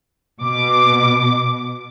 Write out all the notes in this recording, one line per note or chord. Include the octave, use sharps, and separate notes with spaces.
B2 D6